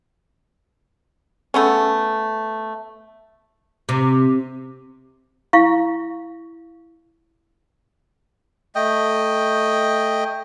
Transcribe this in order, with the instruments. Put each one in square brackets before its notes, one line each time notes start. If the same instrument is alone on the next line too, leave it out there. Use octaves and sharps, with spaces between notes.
[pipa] A3 B3 C#4
[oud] C3
[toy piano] E4 F5 C#6
[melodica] A3 D#5 G5